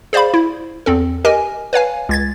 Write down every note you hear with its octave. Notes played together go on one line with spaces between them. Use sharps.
G#4 C5 D5 F5 B5
E4
E2 C4 A4
G4 A#4 D#5 G#5
B4 C#5 F5 G#5
C#2 G#6 A6